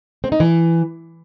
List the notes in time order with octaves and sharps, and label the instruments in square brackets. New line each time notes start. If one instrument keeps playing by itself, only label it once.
[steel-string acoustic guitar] C4
D#4
E3